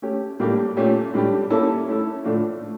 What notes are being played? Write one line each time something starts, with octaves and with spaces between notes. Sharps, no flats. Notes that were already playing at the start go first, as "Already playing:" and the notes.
A3 C#4 G4
A2 G3 A#3 D4 G4
A#2 A3 C#4 G4
A2 G3 D4 G4
A#3 C#4 E4 A4
A3 C#4 E4 A4
A2 F3 A3 D4 F4
A3